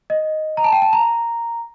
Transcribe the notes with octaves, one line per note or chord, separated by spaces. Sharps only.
D#5
A#5
A5
G5
A5
A#5